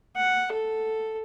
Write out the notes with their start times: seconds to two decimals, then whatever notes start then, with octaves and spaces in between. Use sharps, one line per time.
0.16 F#5
0.52 A4